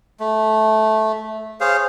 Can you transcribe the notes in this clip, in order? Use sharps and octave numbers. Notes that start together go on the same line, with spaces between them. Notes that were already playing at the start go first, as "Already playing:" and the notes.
A3
G#4 C5 C#5 F5